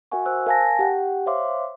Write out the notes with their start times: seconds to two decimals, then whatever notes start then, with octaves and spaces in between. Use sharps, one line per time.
0.12 F#4 A#4 E5 F#5 G#5 C#6
0.26 C5 E6 F#6
0.46 A#4 F5 G#5 A5 A#6
0.79 G4 F#5 G5
1.26 C5 C#5 E5 F5 C6 D6